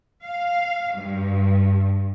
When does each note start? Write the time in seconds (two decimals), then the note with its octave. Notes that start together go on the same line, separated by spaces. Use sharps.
0.24 F5
0.94 G2